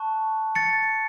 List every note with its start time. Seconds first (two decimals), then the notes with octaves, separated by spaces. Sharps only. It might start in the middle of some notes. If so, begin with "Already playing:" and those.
Already playing: A5 C#6 F#6
0.55 A6 C#7